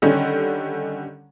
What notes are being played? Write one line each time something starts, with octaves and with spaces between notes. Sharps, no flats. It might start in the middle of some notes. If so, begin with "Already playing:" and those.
D3 D#3 G3 C#4